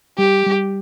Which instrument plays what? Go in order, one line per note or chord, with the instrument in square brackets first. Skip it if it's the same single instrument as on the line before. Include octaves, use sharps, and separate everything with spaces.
[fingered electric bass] G3 [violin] G4
[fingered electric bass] G3